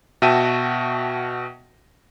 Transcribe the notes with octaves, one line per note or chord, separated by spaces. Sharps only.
B2 F#4 E5 G5 A5 D#7